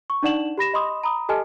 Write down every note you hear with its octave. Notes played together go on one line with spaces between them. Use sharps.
C#6
D4 D#4 D5 F#5 E7 F#7
G4 B5 A#6 E7
D#5 B5 C6 D#6
A#5 B5 D#6
G4 A4 D#5 G#5 A5 F6